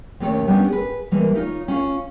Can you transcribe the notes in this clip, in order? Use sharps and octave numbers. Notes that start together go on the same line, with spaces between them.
D#2 C3 A3 C#4 A#4 C#5
G3 B3 C#4 D4
G#4 B4
E3 G3 G#3 A#3
D#4 F4 C#5
C#4 F4 F5